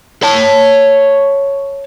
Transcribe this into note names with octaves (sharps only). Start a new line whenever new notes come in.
C#5 A5